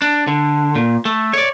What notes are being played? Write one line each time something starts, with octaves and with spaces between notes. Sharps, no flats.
D4
D3
A#2
A3
C#5 D5